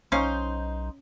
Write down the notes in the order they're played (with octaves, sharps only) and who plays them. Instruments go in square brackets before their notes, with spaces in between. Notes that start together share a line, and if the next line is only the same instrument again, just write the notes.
[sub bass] B1 [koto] C#4 F5 [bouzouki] D#4 C5